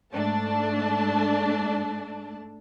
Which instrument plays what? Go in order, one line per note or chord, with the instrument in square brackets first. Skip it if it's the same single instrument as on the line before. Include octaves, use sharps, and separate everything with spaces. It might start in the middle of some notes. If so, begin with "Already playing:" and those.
[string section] G#2 A3 D4 A5